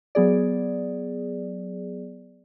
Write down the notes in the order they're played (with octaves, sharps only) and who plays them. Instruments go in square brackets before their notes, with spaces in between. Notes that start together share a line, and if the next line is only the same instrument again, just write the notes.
[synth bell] F#3 B3 G#4 D5